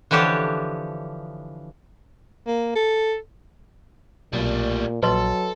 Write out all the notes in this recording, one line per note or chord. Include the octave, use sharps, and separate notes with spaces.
D3 E3 F3 G4 C#5 A5
A#3
A4
B1 A#2 G3 A3
A#1 F#3 A4 B4 D#5 C6